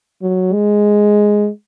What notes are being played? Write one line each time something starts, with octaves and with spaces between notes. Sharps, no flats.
F#3
G#3